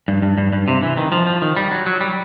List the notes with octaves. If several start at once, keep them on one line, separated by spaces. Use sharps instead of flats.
G2
G2
G2
G2
C3
E3
D#3
F3
F3
D#3
G3
F#3
F#3
G3